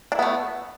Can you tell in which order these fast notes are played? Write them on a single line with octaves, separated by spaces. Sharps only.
D4 E4 B3 A3